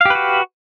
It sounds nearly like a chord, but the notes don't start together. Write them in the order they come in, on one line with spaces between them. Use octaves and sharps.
F5 G4 B4 F#4